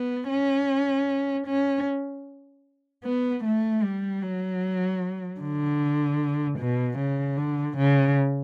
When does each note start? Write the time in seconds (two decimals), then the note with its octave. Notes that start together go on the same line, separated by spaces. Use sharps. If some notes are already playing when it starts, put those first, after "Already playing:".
Already playing: B3
0.30 C#4
1.47 C#4
3.04 B3
3.44 A3
3.83 G3
4.22 F#3
5.41 D3
6.59 B2
6.99 C#3
7.37 D3
7.78 C#3